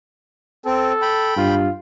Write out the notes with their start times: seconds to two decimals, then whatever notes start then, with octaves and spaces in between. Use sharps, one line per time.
0.66 C4 A4
1.02 G5 B5
1.38 G2 F4